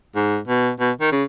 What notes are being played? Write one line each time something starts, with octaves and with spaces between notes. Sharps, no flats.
G#2
B2
B2
D#3
C#3